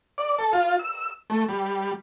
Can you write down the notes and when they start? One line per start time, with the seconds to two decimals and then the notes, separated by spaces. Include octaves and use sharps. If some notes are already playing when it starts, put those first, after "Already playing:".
0.18 D5
0.38 A4
0.53 F4
0.79 E6
1.30 A3
1.49 G3